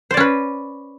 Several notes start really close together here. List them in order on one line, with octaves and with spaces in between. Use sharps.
C5 D5 C#4 B4